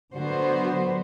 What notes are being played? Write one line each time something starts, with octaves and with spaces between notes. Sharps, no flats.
D3 F#3 B3 F#4 C5